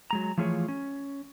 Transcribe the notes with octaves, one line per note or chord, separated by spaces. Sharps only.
F#3 G#3 A#5
E3 F3 A3 F4 G#4 C#5
C#4